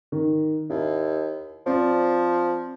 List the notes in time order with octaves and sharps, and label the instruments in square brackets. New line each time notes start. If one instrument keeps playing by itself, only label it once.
[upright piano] D#3
[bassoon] D#2 [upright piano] E4
[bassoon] F3 [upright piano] C4 D5